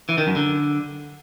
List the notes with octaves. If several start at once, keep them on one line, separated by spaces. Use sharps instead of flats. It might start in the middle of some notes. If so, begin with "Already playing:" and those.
E3
D#3
F#2
D3